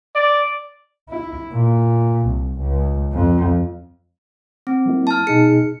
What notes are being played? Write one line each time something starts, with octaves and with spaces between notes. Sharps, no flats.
D5
E4
A#2
C2
C#2
F2
C4
F#3 A#3 E4
A5 F6
B2 D#4 G#4 C#7